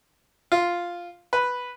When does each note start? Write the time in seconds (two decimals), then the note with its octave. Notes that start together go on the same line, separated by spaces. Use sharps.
0.52 F4
1.33 B4